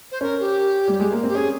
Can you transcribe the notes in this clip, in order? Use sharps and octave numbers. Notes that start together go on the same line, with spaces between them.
C5
C#4 A#4
G4
G3
G#3
A#3
C4
G4
C#4 G#4